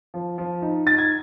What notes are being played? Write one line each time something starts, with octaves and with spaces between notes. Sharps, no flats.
F3
F3
D#4
D#4 A6
G#6